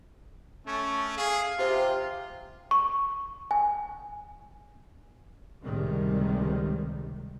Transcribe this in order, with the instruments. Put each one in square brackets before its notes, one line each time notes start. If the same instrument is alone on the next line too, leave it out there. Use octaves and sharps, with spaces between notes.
[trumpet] A3 [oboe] C#4
[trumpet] G#4 [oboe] F5
[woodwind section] C3 [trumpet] F4
[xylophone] C#6
G#5
[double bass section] C#2 A2 C3 D#3 G3 G#3